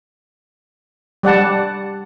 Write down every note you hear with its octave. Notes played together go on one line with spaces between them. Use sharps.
G3 D5 F#5 A5